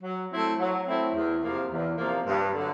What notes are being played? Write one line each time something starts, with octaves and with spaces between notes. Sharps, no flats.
F#3
A3 C4 E4
F#3
A3 C4 E4
E2
C3 F3 A#3
E2
C3 F3 A#3
G2
D3 F#3